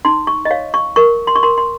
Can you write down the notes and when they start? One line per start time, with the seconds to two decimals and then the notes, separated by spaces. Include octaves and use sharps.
0.05 D#4 C6
0.27 C#6
0.45 D#5
0.51 C#5 F5
0.74 C#6
0.96 A#4 C#6
1.27 C6
1.36 C#6
1.43 A#4 C6
1.58 C6